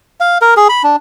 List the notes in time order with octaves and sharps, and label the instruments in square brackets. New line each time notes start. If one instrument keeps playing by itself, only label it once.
[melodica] F5
A#4
G#4
B5
D4